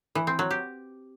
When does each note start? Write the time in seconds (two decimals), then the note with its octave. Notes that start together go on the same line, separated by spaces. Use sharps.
0.15 E3
0.27 C4
0.39 F#3
0.51 G4